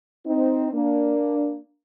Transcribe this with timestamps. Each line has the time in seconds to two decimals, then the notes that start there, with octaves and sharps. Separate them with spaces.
0.26 C4 D#4
0.73 A#3 D4